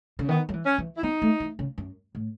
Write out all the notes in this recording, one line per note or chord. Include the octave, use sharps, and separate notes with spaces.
C#3
D#3 B3
F#3
E3
C#4
E3
E4
B3 D#4
A3
E3
C#3
F#2
A2